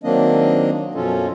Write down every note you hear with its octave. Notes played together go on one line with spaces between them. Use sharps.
D#3 F#3 A#3 C4 D4 D#5
F#2 B2 F3 C#4 F4 A4